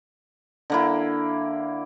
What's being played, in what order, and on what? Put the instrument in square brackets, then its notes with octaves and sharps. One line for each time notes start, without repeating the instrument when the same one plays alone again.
[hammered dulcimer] D3 A#3 E4